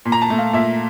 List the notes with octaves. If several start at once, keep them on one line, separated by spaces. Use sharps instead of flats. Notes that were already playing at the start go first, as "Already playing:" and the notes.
A#2
A#5
A5
A3
F5
A#2 E5